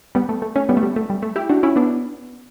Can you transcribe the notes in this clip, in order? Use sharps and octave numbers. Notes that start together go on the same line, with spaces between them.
G3 B3
A3
A3
A3 C#4
G3 B3
A3
G3
A3
G3
A3
E4 G4
D4 F#4
C#4 E4
B3 D4